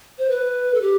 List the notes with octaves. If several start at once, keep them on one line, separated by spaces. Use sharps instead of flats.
C5
B4
A4
G4